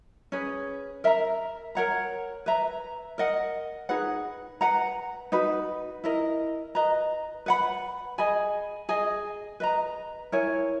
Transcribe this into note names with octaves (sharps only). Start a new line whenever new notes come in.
C#4 G#4 B4
A#4 E5 A#5
A#4 C#5 F#5 A#5
B4 E5 A#5
A#4 D#5 F#5
D#4 G#4 B4 F#5
B4 F#5 A#5
D#4 F#4 B4
E4 A#4 D#5
B4 D#5 A#5
B4 F#5 B5
G#4 D#5 G#5 B5
G#4 D#5 G#5
B4 D#5 A#5
E4 A#4 C#5 G#5